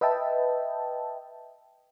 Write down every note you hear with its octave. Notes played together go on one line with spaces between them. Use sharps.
B4 D#5 E5 G5 A5